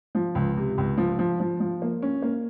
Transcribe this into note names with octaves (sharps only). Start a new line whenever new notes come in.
F3
C#2
C3
C#2
F3
F3
F3
F3
A#3
C#4
A#3